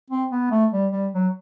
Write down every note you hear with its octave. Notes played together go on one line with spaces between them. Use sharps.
C4
B3
A3
G3
G3
F#3